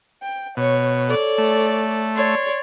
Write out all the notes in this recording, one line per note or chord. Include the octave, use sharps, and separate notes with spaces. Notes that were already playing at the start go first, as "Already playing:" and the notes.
G5
B2 C#5
A4 C#5 D5
A3
C#5 D5 C6